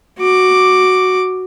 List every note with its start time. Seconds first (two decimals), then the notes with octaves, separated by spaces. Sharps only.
0.19 F#4 D6